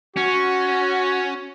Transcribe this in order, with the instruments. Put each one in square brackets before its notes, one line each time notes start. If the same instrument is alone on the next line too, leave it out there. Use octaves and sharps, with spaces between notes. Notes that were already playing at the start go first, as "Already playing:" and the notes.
[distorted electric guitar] C#4 [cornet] F#4